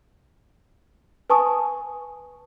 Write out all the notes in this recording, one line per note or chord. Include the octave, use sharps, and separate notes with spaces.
B4 G#5 A5 C#6 D#6